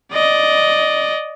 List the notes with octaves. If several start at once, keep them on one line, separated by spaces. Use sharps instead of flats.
D5 D#5